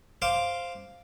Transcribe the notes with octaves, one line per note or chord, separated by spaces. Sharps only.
C5 F5 D6